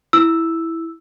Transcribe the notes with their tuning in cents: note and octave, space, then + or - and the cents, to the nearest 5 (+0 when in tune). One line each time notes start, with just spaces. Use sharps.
E4 +0 E6 +0